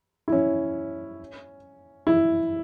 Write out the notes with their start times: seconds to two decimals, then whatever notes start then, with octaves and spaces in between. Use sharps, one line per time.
0.28 E4
0.32 C#4
2.07 E4